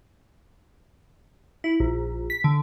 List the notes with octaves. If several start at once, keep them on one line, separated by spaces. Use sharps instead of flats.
E4
A#1
B6
D3